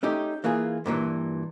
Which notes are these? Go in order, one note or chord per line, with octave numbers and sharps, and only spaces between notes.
A3 C#4 D#4 G4
E3 A#3 F4 G#4
G2 A#2 D#3 E3